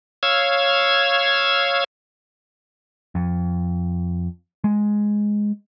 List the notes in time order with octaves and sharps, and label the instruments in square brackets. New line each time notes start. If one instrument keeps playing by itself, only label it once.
[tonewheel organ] C#5 F5 E6 G#6
[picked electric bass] F2
G#3